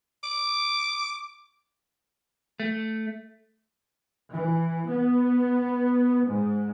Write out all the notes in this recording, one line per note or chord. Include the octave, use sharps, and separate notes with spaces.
D6
A3
E3
B3
G#2